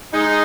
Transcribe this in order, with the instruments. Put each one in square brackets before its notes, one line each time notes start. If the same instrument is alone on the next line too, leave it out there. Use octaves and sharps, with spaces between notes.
[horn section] G#3 D#4